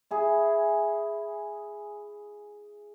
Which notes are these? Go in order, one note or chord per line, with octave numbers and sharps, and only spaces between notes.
E4 G#4